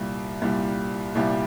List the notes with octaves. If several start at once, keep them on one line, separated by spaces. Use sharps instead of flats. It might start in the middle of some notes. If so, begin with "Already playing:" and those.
Already playing: C2 A#2 G3
C2 A#2 G3
C2 A#2 G3